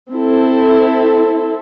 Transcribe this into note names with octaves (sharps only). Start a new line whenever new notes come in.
C4 E4 A4